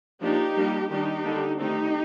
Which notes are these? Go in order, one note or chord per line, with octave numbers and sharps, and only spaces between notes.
F3 A#3 D4 D#4 G4
G3 A#3 D4
D#3 G3 D4 D#4 G4
D3 G3 A#3 D4
D#3 A3 C4 D#4 G4